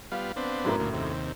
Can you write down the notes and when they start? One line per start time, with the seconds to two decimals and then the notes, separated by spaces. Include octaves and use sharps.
0.12 G3 B3 F4 F5
0.36 B3 C4 D4
0.65 F#2 A2 A#4
0.80 D2 A#2
0.94 D#2 C3